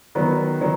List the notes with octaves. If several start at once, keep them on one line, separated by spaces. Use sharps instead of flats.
D#3 F#3 B3
D#3 F#3